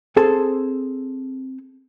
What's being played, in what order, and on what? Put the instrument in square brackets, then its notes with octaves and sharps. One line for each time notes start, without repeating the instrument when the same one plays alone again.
[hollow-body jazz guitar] C4 G#4 A4 C5 A5